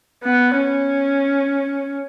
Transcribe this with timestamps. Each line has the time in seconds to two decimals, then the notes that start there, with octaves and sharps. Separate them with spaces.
0.24 B3
0.57 C#4